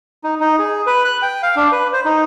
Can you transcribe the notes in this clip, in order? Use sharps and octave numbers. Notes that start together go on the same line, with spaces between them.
D#4
D#4
G#4
B4
F#6
G5
F5
D4
B4
C5
D#4